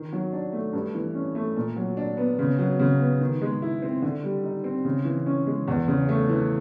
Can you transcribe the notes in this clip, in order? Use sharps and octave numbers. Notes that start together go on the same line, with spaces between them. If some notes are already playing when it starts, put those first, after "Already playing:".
Already playing: D#3
F#3
D4
A3
G2
E3
C#4
A3
A#2
F#3
D4
B3
C#3
F#3
C#3
B3
D#3
G#3
E4
C4
D3
G3
D#4
C4
C#3
E3
C#4
G#3
E2
C#3
A3
E3